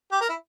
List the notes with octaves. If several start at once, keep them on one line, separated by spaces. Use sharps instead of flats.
G4
A#4
E4